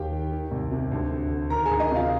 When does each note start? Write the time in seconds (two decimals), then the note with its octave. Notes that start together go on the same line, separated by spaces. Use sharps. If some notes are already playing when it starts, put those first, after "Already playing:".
Already playing: D#2 D#3 G4 G5
0.11 D#3
0.32 D#3
0.51 C2
0.71 C3
0.91 D2
1.11 D3
1.31 D3
1.50 D#3 A#4 A#5
1.65 D2 G#4 G#5
1.80 D#4 D#5
1.91 C3 F4 F5